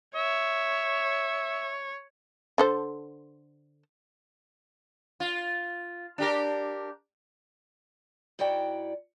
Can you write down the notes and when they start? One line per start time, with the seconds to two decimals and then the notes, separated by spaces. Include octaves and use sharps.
0.16 C#5 E5
2.58 D3 A4 C5
5.20 F4
6.18 D4 G4 A#4
8.39 G#2 E4 F#4 D5 G5